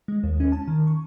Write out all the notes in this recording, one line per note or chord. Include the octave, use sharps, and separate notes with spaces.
G#3
D#2
C#4
A5
D#3
C#6